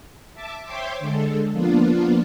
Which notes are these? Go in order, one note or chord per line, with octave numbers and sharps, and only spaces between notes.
E5 A5 D6
C5 C#5 E5 G5 C6 D6
D3 G#3 A4
F3 A#3 B3 D4 F4